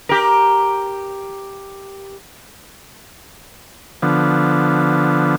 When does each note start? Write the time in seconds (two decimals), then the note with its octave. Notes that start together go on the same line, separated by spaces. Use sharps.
0.09 G4 A#4
4.02 D3 F3 B3